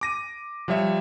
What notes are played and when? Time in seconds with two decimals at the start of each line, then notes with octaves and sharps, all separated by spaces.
0.01 D6 A#6 D#7
0.68 F3 G3 C#5 E5